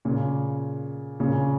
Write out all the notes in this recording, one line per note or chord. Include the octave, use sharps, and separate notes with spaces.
A#2 C#3
A#2 C#3